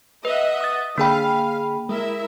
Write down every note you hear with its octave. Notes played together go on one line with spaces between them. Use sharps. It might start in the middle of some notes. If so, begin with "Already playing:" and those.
B4 D#5 E5 F#5
D#6 A6
D3 A#3 G#4 F5 G5 B5
G#3 E4 A#4 E5